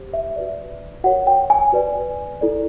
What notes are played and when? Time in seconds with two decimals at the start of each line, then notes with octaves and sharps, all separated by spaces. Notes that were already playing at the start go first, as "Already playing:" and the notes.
Already playing: G4 C5
0.13 E5
0.36 F#4 B4 D5
1.04 F#4 A#4 C#5 F#5
1.27 G5
1.50 G#5
1.72 F#4 B4 D5
2.41 E4 A4 D5